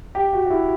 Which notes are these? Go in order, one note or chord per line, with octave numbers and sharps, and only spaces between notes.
G4
F#4
F#4
E4